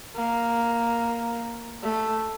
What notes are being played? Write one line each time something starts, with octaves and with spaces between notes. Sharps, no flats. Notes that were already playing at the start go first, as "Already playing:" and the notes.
A#3
A3